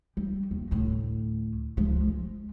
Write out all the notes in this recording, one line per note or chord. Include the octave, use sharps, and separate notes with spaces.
G3
D#2
D2 A2
C#2 F3
G#3